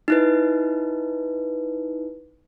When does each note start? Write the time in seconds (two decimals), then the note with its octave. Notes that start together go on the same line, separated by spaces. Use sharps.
0.08 D#4 E4 B4